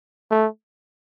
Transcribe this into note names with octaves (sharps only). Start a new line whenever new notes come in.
A3